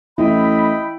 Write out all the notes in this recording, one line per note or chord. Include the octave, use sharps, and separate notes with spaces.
A1 E4 D#5 G5 B5